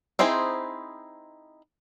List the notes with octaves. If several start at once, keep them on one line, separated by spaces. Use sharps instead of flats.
C4 D#4 E4 G#4 C5